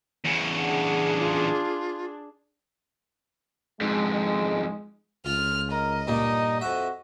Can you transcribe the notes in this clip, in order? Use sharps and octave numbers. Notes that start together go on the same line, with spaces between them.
E2 C#3
D4 G#4 F#5
F4
F2 G#2 G#3
C#2 F4 F6
A#4 D#5
G2 A#2 A#3 D#4
F2 F#4 E5